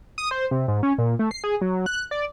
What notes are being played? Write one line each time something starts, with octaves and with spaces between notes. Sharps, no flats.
D#6
C5
C3
G#2
C#4
A#2
A3
C7
G#4
F#3
F#6
D5